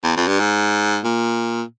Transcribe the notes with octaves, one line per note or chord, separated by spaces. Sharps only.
E2
F2
G2
G#2
A#2